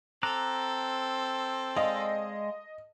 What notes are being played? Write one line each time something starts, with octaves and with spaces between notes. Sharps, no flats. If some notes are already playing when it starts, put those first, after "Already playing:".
C4 A4 A#5 D6 F#6
G#3 D5 D#5 F5